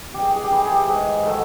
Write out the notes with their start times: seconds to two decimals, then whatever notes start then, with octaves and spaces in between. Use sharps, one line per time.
0.14 G2 G4
0.21 G#4
0.29 G4
0.36 G#4
0.44 G4
0.51 E3 G#4
0.58 G4
0.65 G#4
0.72 G4
0.89 G#2 G#4
1.26 D#3 F#3 A4